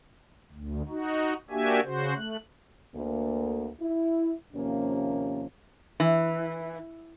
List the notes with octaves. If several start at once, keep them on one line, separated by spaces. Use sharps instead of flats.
D2
D#4 F#4
A#3 D4 F#4 G4 E5 G#5
C#3 F#4 C5
A3 F#6
D2 A#3
E4
D#2 C3 F3 A#3 C#4
E3